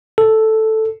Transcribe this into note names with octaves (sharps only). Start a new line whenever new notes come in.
A4